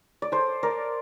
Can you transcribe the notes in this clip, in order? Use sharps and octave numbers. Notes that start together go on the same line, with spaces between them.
D5
A4 C5
A#4 D5